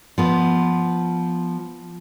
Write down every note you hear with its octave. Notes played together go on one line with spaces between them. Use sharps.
F3 B3